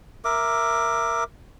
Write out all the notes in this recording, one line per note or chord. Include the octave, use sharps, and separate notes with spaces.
A#4 E5 D6